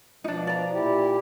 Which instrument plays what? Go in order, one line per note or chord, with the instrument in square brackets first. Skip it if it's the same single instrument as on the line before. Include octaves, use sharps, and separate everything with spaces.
[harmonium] B2 F3 [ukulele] D4 D#4
[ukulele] D5 A#5
[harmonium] A#2 E4 G4